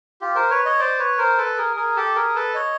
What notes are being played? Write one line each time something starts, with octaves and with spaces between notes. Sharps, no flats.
F4 G4
A#4 C5
B4 C#5
C#5 D#5
C5 D5
B4 C#5
A#4 C5
A4 B4
G#4 A#4
G#4 A#4
G4 A4
G#4 A#4
A4 B4
C#5 D#5